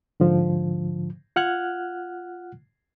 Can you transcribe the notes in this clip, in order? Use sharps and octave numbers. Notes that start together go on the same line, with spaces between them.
G#2 D3 F3
F4 F#5 F6 F#6 G#6